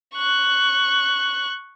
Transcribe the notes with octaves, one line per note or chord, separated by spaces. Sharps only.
C#6 F#6